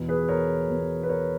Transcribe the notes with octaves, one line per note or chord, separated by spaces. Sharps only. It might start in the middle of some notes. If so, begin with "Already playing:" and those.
Already playing: E2 B2
G#4 B4
A#4 C#5
E2 B2
B4
A#4 C#5